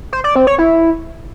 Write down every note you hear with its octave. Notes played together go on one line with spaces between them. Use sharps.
C5
D5
C4
C#5
E4